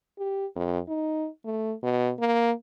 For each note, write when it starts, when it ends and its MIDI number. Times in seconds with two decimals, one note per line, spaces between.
0.19 0.46 67
0.56 0.79 41
0.88 1.28 63
1.45 1.74 57
1.82 2.11 47
2.19 2.52 58